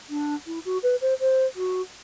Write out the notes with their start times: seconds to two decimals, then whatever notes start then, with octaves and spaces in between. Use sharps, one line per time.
0.09 D4
0.46 E4
0.65 F#4
0.83 B4
1.01 C5
1.20 C5
1.56 F#4